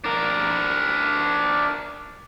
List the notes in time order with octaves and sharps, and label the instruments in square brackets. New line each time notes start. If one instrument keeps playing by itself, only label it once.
[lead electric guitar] D4 A#4